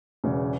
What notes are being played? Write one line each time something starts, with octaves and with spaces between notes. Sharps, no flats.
E1 E2 C#3